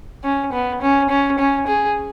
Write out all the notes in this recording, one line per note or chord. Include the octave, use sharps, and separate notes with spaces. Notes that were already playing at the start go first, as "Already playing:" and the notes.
C#4
B3
C#4
C#4
C#4
G#4